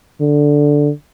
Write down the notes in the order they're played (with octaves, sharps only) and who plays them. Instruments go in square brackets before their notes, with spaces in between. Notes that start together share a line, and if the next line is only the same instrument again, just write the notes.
[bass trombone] D3